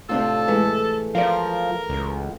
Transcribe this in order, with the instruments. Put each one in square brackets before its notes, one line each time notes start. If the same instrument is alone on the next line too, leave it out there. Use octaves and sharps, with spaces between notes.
[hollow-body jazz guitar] A2 C3 [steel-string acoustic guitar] C4 D4 F4 [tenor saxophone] A4
[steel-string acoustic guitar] E3 G#3 A3
[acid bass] F3 [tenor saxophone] A#4 [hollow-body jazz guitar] D5 F5
[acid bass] C#2